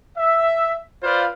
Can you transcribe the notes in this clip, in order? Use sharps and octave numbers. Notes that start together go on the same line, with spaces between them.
E5
F4 B4 C5 D5 F5